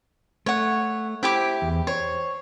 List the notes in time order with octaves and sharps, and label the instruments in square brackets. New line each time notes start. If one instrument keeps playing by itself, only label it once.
[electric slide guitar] A3 [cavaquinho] C#5 F#5
[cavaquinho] E4 G4 D6 [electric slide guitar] C5
[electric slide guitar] E2
[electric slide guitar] C5 [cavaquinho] C#5